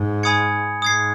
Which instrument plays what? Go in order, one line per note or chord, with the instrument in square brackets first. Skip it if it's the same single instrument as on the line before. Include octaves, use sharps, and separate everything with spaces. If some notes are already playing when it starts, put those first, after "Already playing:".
Already playing: [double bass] G#2
[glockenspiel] G#5 B5 D#6 G#6 C#7
[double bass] G#2 [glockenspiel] D#6 G#6 C7